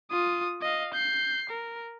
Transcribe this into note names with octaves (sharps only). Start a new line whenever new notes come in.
F4 D#6
D#5 F5
G6 C7
A#4